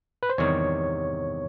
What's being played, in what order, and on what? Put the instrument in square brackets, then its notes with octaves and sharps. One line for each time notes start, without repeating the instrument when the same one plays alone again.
[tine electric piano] B4
C5
[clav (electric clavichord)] E2 C3 D#3 G3 [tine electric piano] C#5